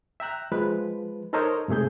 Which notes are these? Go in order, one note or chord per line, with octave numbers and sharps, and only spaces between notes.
E5 G5 A#5 F#6
F3 G#3 B4
D#4 A4 A#4 C5 C#5 D#5
G#2 C3 A3 G#4 G6